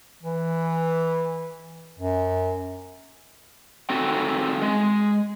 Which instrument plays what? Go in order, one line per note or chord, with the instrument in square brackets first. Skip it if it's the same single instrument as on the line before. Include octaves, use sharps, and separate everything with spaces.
[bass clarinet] E3
F#2
[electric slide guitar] C4 D#4 F#4 A4
G#3